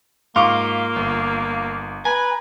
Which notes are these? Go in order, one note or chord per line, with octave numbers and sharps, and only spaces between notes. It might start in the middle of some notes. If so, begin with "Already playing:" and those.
G#2 A#3 F4 F5 C#6 D6
G1
B4 G#5 A#5